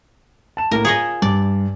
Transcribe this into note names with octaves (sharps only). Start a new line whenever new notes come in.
A5 E7
A2 A#3 A#4
F4 G#4 C#5 D#5
G2 D5